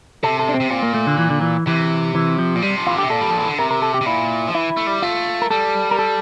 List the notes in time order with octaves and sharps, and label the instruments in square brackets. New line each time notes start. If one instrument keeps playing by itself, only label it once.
[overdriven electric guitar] C3 [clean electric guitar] A4
[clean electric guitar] A4
D4
C4
[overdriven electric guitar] C3
[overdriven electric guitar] A#2 [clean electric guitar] C4
[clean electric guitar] A#3
A3
D3
E3
D3
E3
[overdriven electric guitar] C3 [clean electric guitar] E3
[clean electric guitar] E3
F3
[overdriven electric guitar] A#2
[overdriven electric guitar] C3 [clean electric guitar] G3
[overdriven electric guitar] F3
[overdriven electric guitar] E3 [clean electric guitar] F4
[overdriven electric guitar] D3
[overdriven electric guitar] C3 [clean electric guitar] G4
[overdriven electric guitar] A#2 [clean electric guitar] A4
[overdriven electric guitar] G3
F3
E3
D3
[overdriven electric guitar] C3 [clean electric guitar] A#4
[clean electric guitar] A#4
A4
G4
[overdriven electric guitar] C3
[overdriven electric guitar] A#2 [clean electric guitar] E4
[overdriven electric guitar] F3
[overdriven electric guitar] E3 [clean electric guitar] E4
[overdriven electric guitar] A3
G3
[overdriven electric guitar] A3 [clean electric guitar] F4
[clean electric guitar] A#4
[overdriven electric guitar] G3 [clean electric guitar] A4
[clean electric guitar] A#4
A4